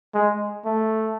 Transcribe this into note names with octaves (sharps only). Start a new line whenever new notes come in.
G#3
A3